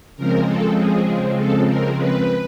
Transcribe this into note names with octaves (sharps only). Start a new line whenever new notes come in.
C#3 F3 G#3 C4 A#4
A4
G#4
A4
A#4
B4